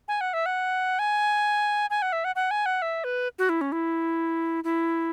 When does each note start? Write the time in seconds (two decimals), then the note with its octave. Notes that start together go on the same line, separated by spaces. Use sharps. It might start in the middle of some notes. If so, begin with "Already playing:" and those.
0.08 G#5
0.21 F#5
0.33 E5
0.46 F#5
0.99 G#5
1.90 G#5
2.02 F#5
2.12 E5
2.24 F#5
2.35 F#5
2.51 G#5
2.66 F#5
2.82 E5
3.04 B4
3.38 F#4
3.49 E4
3.61 C#4
3.72 E4
4.64 E4